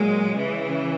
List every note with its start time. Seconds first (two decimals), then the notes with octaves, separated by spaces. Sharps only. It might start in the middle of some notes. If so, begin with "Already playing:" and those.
Already playing: A#2 F#3 G#3
0.36 C#3 E3